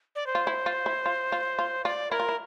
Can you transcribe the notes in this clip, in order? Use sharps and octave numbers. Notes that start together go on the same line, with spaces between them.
D5
C5
F4
E4
F4
E4
F4
F4
F4
F4 D5
E4 A#4
F4
E4